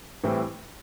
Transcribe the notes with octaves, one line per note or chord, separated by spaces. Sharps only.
A2 E3 G3 C4 E4